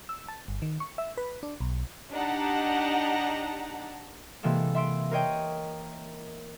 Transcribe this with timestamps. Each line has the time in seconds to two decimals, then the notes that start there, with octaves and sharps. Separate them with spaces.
0.09 E6
0.28 A5
0.48 G1
0.62 D#3
0.80 C#6
0.98 E5
1.17 B4
1.43 D4
1.61 B1
2.12 D4 D#4 G4 F#5 A5 A#5
4.43 C3 E3 G#3 A#3 A4
4.75 E5 C6 E6 D7
5.11 A#4 C5 C#5 D#5 G5